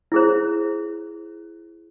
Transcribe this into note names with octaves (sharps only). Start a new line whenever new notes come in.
E4 G#4 C5